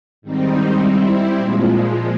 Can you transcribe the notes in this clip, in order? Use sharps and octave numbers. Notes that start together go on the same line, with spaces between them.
G#2 D#3 G3 C4 D#4
G3 C4 E4
A#2 F3 G#3